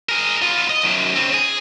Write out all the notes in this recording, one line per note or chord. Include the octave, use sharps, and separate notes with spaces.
G#4 A#4
B3 F4
D#5
F#2 D#3
C#3 C4
G#4